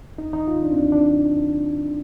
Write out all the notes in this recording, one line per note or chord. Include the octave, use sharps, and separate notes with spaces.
D#2 D#4
D#3 D#4
D#3 F4
D#2 D4
C4
D#2 D4
D#3 D4